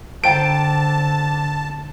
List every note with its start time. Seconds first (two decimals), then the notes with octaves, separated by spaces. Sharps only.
0.24 D3 C5 G5 A5 A#5 D7